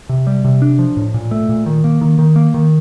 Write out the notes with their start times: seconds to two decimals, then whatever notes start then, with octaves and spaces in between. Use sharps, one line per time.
0.09 C3
0.27 G3
0.45 C3
0.62 D4
0.79 F3
0.97 A2
1.14 A#2
1.31 A3
1.49 A#2
1.66 D#3
1.84 A#3
2.01 D#3
2.19 D#3
2.36 A#3
2.54 D#3